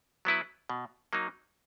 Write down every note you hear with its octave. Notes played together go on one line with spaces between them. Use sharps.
F#3 B3 E4 B4
B2
F#3 A#3 D#4